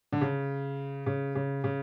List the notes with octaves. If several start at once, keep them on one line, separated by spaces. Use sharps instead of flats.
D3
C#3
C#3
C#3
C#3